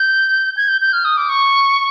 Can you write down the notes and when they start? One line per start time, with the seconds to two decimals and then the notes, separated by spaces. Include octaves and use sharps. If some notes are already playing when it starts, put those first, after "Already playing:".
Already playing: G6
0.57 G#6
0.68 G6
0.82 G6
0.93 F6
1.05 D#6
1.17 D6
1.29 C#6